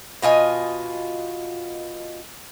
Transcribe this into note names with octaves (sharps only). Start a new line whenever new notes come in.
B2 F4 D#5 G#5